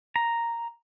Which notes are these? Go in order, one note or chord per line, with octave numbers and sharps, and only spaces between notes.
A#5